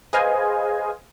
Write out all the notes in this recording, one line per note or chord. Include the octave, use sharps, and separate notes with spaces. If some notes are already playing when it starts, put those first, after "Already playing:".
G#4 B4 C5 D#5 F5 G#5